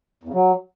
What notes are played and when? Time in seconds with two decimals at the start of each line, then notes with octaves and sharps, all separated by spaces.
0.23 E2
0.29 C#3
0.34 F#3